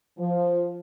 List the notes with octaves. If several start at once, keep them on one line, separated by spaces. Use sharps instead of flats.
F3